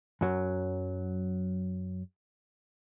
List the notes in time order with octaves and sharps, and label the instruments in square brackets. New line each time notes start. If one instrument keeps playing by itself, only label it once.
[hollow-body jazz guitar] F#2 F#3